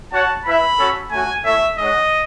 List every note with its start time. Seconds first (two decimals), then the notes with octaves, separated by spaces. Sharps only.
0.12 F#4 C#5 F#5 A5
0.45 E4 B4 E5 B5
0.78 C#4 F#4 A4
1.11 A3 C#4 F#4 G#5
1.45 A3 E4 A4 C#5 E5
1.78 G#3 D#4 G#4 C#5 D#5 F#5